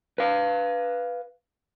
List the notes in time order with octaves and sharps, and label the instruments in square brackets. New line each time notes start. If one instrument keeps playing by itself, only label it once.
[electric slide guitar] B4 F5